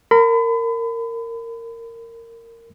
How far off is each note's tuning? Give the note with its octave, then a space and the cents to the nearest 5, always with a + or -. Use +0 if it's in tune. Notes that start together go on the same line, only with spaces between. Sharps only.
A#4 -20 B5 +35